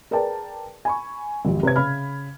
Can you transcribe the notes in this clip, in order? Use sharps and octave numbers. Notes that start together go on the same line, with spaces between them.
G#4 A#4 B4 D5 G5 A5
G#5 B5 C#6
G#1 F2 G4
C3 B4 C#5 G#6
C#3 B5 F6